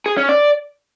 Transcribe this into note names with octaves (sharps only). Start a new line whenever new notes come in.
G#4
C#4
D5